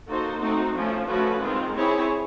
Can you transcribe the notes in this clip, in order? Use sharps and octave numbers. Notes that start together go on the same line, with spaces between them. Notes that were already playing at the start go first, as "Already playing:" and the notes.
A#3 D#4 F#4 A4 C5
A3 C4 D#4 F#4
F3 A3 C#4
F3 A3 C#4 F#4 B4
D#3 G#3 C4 F4
C4 E4 G#4 C#5